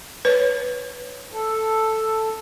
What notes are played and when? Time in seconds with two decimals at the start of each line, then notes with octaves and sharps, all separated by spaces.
0.25 B4 C#5
1.33 A4